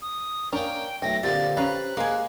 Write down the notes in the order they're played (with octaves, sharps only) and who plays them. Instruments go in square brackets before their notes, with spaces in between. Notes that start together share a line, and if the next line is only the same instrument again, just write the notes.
[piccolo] D#6
[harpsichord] A#3 C#4 [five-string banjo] D4 A#4 A#5 [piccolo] G5
[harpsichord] B1 A3 [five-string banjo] G5 [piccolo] A#6
[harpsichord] A#2 D3 F3 [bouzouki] C4 G4 [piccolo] A6
[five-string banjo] C#4 F5 B5 [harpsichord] B4 A#5 [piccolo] F#6
[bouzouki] G#3 G#5 [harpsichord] A#3 [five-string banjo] G#4